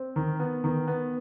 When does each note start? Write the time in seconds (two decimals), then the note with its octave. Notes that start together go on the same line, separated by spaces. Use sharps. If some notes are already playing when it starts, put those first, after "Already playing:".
Already playing: C4
0.16 D#3
0.40 B3
0.64 D#3
0.88 B3